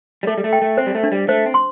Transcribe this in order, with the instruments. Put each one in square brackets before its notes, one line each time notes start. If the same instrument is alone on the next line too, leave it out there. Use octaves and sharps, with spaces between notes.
[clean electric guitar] G3
[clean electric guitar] A3 [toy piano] A4
[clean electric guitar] G3
A3
[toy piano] G5
[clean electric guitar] A3
[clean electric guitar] C4 [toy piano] C5
[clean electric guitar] G3
A3
[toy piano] D4
[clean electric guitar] G3
[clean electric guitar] A3 [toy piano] C5
[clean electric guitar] C4
[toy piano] C6